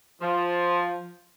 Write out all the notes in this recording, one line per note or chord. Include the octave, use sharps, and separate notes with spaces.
F3